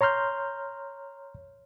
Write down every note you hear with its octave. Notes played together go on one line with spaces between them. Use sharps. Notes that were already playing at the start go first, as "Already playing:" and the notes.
C#5 A#5 C6 F6 G6